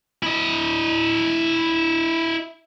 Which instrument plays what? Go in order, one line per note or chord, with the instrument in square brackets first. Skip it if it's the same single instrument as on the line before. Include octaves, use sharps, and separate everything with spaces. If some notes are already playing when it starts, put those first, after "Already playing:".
[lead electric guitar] E4 D#5